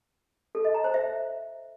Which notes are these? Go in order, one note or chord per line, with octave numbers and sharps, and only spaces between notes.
A4
D#5
A#5
C5
E5